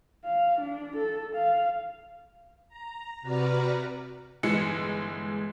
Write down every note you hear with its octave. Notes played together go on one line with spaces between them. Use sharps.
F5
D4
A4
F5
A#5
C3 F#4 B4 D5 A#5 F6
G1 E3 G#3 C#7